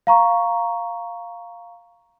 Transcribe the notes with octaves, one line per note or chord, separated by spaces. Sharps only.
F5 A#5 C#6